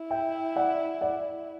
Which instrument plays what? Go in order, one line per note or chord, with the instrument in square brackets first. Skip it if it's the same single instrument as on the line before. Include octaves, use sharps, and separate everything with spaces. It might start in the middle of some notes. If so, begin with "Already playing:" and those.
Already playing: [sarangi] E4
[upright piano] E5 G5
D5 F#5
D5 F#5